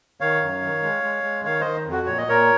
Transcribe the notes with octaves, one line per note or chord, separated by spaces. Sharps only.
D#3 C#5 F5
F#2
D#3
G#3
G#3
G#3
D#3 C#5 F5
D#3 C5 D#5
F2
F#4
A#2 C#5
D#5
A#2 A#4 C#5